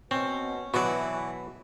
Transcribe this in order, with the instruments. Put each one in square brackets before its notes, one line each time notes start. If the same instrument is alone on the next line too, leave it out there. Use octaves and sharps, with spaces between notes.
[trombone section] B2 [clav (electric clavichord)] C4 [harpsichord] C#4
[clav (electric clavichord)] B2 F#3 [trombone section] E3 [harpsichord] F#4 D5